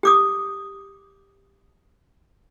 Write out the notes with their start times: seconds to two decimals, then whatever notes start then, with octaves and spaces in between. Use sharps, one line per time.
0.03 G4 D6 D#6